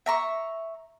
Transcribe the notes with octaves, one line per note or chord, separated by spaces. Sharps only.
E5 A#5 C#6